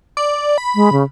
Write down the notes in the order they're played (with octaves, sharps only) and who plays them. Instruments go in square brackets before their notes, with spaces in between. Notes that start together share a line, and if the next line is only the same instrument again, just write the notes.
[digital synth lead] D5
B5
[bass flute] G#3
C#3